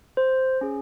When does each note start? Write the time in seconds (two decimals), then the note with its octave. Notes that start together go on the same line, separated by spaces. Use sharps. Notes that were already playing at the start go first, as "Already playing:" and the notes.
0.17 C5
0.61 C#4 G#4